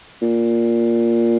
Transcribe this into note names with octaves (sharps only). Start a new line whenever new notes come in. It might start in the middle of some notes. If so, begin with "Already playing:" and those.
A#2